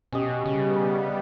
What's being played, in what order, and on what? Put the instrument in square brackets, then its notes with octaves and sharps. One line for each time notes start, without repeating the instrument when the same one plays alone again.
[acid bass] B2 [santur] C#4 G4 D#5
[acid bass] C#3 [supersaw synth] G3 B3